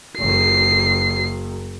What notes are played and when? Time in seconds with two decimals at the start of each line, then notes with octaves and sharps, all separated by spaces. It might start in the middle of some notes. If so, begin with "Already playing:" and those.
0.19 F#1 C7